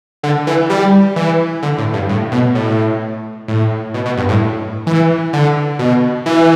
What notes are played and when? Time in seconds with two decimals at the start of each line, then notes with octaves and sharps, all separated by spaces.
0.23 D3
0.47 E3
0.70 G3
1.16 E3
1.63 D3
1.78 A2
1.93 G2
2.09 A2
2.32 B2
2.55 A2
3.48 A2
3.94 B2
4.06 B2
4.17 G2
4.29 A2
4.87 E3
5.33 D3
5.79 B2
6.26 E3